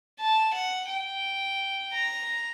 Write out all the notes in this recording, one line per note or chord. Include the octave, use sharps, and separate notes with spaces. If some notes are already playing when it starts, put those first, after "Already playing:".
A5
F#5
G5
A#5